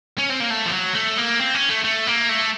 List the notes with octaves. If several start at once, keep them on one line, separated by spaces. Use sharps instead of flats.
C#4
C4
A#3
A3
F3
F#3
A3
A#3
C4
C#4
A3
A3
A#3
A3